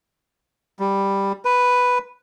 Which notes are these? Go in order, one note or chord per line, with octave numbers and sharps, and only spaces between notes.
G3
B4